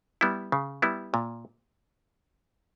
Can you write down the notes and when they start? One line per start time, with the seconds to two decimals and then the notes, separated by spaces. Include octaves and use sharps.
0.21 G3 B3 E4
0.52 C#3
0.82 G3 B3 E4
1.14 A#2